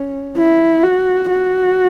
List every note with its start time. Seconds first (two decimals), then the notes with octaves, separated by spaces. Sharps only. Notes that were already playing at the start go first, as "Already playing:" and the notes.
Already playing: C#4
0.38 E4
0.83 F#4
1.30 F#4